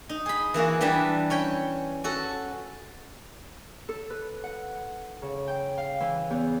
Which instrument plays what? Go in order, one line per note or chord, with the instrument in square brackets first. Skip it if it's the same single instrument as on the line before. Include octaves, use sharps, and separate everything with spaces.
[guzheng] D#4
G#4 B5
E3 A#3 E4 F#4
E3 G3 D4 B4 A5
C#4 C#5 G5 B5
C#4 F#4 A4
[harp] A4
B4
F#5
C#3
G5
F5
E3
E2